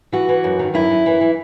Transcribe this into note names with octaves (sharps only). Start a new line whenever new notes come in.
E3 F#4
E3
F#2
D#3
F#2 E4
F#2
E3
E3